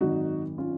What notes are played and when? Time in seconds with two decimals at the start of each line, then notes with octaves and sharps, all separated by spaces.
0.01 G#1 F#2 D#3 D#4 F#4
0.58 C#4 F4